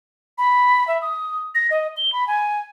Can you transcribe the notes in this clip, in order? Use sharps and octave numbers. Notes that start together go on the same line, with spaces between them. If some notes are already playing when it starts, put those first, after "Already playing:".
B5
E5
D#6
A#6
D#5
G7
B5
G#5